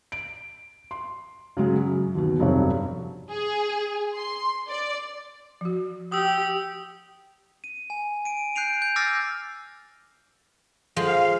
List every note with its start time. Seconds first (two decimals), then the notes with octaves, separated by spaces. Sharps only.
0.12 D7
0.91 C6
1.57 C#3 F#3 G#3
1.87 F#2
2.15 D#2 B2
2.39 F1 B1 G2 C4 C#5
3.29 G#4
4.15 C6
4.68 D5
5.61 F3 F#4
6.12 G4 D#6 E6
7.64 D#7
7.90 G#5
8.25 D7 D#7
8.56 F#6 G6 C7 D7 F7
8.82 G6
8.96 D6 E6 F6 A6 A#6 C7
10.96 F3 G#3 F5